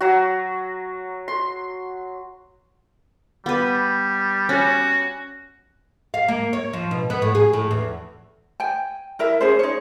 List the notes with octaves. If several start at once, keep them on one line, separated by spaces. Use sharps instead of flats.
F#3 F#4
C6
G3 B3 B4
C#4 F#4
F5
A#3
C#5
F3
B2
B3
A2
G#4
A2
E2
G5 G#5
E4 A#4 E5
C#4 G#4 C5
D#4 C#5